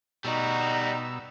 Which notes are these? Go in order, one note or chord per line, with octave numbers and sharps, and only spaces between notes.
B2 G3 D#4 F#4 E6